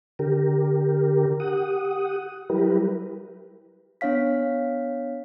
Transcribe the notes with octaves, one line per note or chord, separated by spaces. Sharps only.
D3 G4 A#4
G4 F#5 D#6
F#3 G3 E4 G4 A#4 B4
B3 D4 C#5 F5 B6